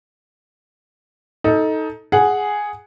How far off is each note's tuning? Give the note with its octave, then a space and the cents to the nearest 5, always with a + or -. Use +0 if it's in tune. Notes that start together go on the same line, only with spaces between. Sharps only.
D#4 +15 A4 +0
G#4 +0 F#5 +0